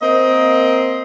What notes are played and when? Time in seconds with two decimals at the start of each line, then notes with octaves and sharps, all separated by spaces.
0.02 A#3 C4 D#5